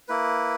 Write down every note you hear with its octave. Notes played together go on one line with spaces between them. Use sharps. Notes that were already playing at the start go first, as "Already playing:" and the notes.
A#3 E4 B4